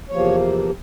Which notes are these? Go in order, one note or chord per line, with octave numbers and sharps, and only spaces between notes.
E2 C3 F3 A#3 C#5